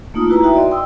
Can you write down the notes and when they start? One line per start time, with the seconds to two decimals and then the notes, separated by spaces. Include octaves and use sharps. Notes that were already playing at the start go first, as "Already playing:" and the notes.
0.14 A3 A#3 D#4 F4 D#6
0.28 E4 F#4 B4 A#5
0.43 D#4 F#4 E5 G5
0.56 D5 D#5 C6
0.71 G5 C6 D#6 E6